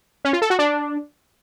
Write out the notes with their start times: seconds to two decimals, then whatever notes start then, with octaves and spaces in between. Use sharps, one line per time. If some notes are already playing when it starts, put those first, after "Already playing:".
0.25 C#4
0.33 F4
0.42 A4
0.50 F#4
0.59 D4